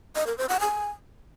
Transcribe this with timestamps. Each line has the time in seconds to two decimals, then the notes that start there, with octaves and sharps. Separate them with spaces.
0.16 D#5
0.27 A#4
0.38 C5
0.49 F#5
0.60 G#5